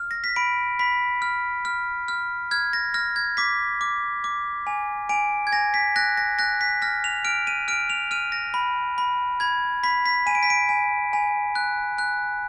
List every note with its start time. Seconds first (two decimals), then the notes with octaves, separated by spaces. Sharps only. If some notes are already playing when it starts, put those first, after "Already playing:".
Already playing: F6
0.11 A#6
0.24 B6
0.36 B5 D7
0.79 B5 B6
1.22 F6
1.65 F6
2.08 F6
2.51 F6 G#6
2.73 A#6
2.94 F6 A#6
3.16 G#6
3.37 D6 B6
3.81 D6
4.24 D6
4.67 G#5
5.09 G#5 D7
5.47 G#6
5.52 G#5 A#6
5.74 B6
5.96 F#6 A#6
6.17 A#6
6.39 F#6 A#6
6.61 B6
6.82 F6 A#6
7.04 F7
7.25 F6 D7
7.47 D#7
7.68 F6 D7
7.90 F7
8.11 F6 D#7
8.32 A#6
8.54 B5
8.98 B5
9.40 B5 G#6
9.83 B5 B6
10.06 B6
10.26 G#5 D#7
10.35 D7
10.43 B6
10.50 D7
10.69 G#5
11.13 G#5
11.55 F#6
11.98 F#6